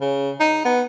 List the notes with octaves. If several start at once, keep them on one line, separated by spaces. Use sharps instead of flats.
C#3
D#4
B3